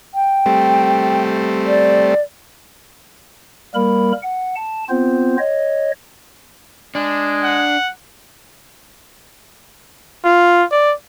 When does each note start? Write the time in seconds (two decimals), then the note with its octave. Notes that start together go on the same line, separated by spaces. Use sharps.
0.14 G5
0.46 G3 A3 C4
1.67 D5
3.74 G3 A#3 A#4 B5
4.23 F#5
4.56 A5
4.89 B3 C4 F4 C5
5.38 C#5 D#5
6.95 G#3 D4
7.44 F#5
10.25 F4
10.72 D5